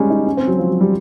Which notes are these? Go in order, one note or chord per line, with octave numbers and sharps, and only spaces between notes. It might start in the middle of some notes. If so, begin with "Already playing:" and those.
Already playing: G3 G#3 C#4
D#4
C#4
C4
F#3
F3
F#3
G3